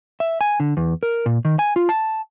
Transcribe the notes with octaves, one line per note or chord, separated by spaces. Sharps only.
E5
G#5
D3
E2
A#4
A#2
D#3
G#5
F4
A5